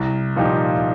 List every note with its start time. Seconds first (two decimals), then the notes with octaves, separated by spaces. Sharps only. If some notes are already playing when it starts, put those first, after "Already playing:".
Already playing: C2
0.36 A#2 F3 D#4 G4